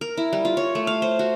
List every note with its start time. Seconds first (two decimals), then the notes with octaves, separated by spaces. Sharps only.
0.01 A#4
0.17 E4
0.33 G3
0.45 F4
0.57 C#5
0.75 A3
0.87 F5
1.02 C5
1.19 F#4